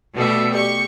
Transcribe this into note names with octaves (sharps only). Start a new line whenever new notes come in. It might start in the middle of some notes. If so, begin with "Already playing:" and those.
B2 G3 A3 E5
G4 C#6